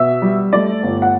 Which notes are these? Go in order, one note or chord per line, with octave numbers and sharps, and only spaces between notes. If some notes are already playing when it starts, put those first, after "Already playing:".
Already playing: B2 E5
G3
A3 D5
G1
F#5